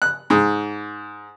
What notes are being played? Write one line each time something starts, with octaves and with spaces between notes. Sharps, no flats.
F#6
G#2